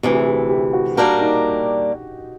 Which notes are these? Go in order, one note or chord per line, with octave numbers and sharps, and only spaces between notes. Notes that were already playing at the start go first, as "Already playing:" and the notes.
D2 C3 E3 G4
G#4
G4
G4
F#4
G3 A#3 D4 F#4 G4 A#4
D#4